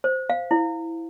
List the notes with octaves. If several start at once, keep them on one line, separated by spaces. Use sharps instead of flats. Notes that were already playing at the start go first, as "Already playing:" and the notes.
C5
F5
E4